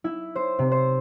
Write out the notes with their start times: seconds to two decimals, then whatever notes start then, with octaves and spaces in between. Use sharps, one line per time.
0.04 E4
0.36 C5
0.59 C3
0.72 C5